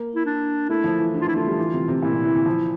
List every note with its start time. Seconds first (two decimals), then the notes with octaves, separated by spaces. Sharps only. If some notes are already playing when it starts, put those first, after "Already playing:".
Already playing: A#3
0.16 E4
0.26 D4
0.69 A3 E4
0.84 F3
0.98 E3
1.14 D3
1.21 F4
1.25 E3 E4
1.36 A3 F4
1.47 G3
1.58 E3
1.73 C3
1.88 C3
2.02 A#2 E4
2.13 C3
2.25 E3
2.35 E3
2.46 F3